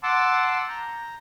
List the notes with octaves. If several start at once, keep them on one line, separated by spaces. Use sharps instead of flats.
F#5 A5 C6 D6 E6
A#5 G6